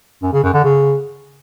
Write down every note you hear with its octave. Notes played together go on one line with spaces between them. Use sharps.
F#2
C#3
F#2
D3
C#3